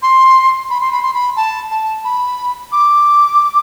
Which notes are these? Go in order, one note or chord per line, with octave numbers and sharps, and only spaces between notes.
C6
B5
C6
B5
C6
B5
A5
A5
B5
D6